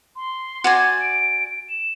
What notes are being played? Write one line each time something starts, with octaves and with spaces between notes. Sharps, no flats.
C6
F#4 D5 G#5
D7
E7